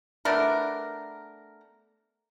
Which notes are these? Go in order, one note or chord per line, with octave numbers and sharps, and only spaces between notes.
A3 B3 D4 A#4